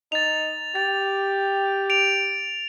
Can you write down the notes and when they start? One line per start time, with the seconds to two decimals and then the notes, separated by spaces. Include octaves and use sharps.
0.12 D#4 A6 F7
0.75 G4 A6
1.90 D7 F7